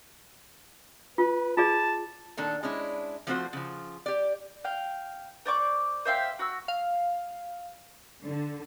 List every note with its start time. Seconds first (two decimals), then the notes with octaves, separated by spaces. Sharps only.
1.18 F4 B4
1.57 F4 G#4 D5 A5
2.37 A#2 D#3 D4 A4
2.63 G#3 C#4 D4 E4
3.27 F3 A3 C4 F4 F#4 C5
3.53 C#3 F3
4.06 G4 D5
4.64 F5 G5
5.46 C5 D5 C#6 D6
6.05 C5 E5 F5 G5
6.39 F#4 E6
6.68 F5
8.23 D3